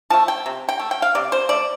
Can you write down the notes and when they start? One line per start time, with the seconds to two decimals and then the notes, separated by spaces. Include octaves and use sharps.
0.10 F3 A3 A5
0.28 G5
0.46 C3
0.69 G5
0.79 A3
0.91 G5
1.02 F5
1.15 C3 D5
1.32 C5
1.49 A3 D5